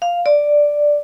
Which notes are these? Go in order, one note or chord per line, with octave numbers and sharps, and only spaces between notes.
F5
D5